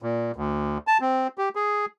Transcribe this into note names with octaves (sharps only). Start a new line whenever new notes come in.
A#2
D2
A5
C4
G4
G#4